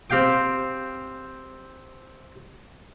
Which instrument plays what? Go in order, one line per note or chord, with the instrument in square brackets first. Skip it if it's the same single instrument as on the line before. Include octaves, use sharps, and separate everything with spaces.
[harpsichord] C4 G4 F5 G5 D6